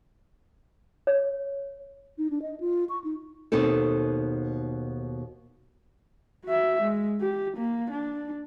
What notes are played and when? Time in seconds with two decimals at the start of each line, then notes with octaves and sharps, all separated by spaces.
1.07 C#5
2.18 D#4
2.30 D4
2.42 D#5
2.60 F4
2.89 C#6
3.04 D#4
3.52 D#2 B2 C4 D#4 A4
6.44 F#4 E5
6.82 G#3
7.21 G4
7.57 A#3
7.91 D4